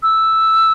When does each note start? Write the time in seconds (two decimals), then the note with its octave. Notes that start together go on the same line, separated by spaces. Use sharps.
0.03 E6